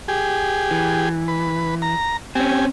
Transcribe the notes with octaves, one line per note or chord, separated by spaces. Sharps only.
G4 G#4
E3
B4
A#5
C4 C#4 G4 G#5